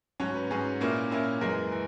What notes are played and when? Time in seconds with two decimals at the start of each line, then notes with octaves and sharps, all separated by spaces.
0.20 G#2 F#3 C#4 C#5
0.35 B4
0.51 G#2 F#3 C#4 G#4
0.81 A#2 A#3 C#4 E4
1.11 A#2 A#3 C#4 E4
1.41 F#2 E3 G#3 A#4
1.72 E3